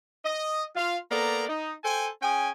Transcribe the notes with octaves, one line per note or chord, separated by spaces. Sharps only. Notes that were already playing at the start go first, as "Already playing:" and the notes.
D#5
F4 F5
A#3 B3 A4 D5 A#5
D#4
A4 C5 G5 G#5
C#4 G#4 G5 G#5